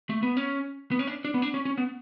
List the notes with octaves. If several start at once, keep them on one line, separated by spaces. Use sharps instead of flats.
A3
B3
C#4
B3
C#4
D4
D4
B3
D4
C#4
C#4
B3